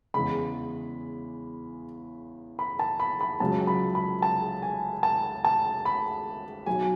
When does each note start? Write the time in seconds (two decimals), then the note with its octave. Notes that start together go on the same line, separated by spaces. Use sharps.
0.14 E2 C#3 G#3 B5
2.59 B5
2.79 A5
3.00 B5
3.21 B5
3.40 C#2 C#3 F#3 A5
3.67 B5
3.95 B5
4.22 A5
4.62 G#5
5.03 A5
5.44 A5
5.85 B5
6.66 B1 B2 F#3 G#5